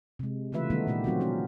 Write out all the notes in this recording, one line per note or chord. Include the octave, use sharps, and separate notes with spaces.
C3 G#3
C#3 E3 A3 F4 B4 E5
D#3 G3 A3 B3 D#4
A#2 A3 A#3 G4
F#3 C4 F4 F#4
B3 C#4 A#4